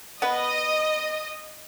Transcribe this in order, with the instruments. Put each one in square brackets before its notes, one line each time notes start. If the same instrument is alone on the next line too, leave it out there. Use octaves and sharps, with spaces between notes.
[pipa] B3 B4 [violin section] D#5